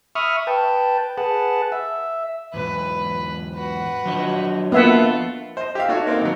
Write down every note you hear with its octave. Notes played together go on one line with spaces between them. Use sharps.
E5 B5 C#6 D#6 F6
B4 G5 A5
G#4 B4 F#5 A5
E5
E2 G#2 B4
F#4 B4
F3 F#3 D4 D#5
A#3 B3 F4 A4 E5 F#5
C5 D#5
G4 E5 F5
A3 D#4 F#4 C#5
A#3 C4 D#4
G#1 F#3